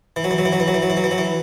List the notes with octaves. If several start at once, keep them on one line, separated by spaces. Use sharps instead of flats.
E3
F#3
E3
F#3
E3
F#3
E3
F#3
E3
F#3
E3
F#3
E3
F#3
E3